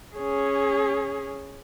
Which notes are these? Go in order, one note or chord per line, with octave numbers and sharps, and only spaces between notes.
C#4 G#4